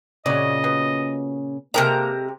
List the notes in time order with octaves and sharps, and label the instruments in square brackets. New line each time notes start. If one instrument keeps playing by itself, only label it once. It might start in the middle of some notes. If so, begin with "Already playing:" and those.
[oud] A#2 C#3 [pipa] F#3 D5 [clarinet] D#5
[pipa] B2
[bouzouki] C3 A#4 A#5 [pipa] G#3 G4 A4 [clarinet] A#3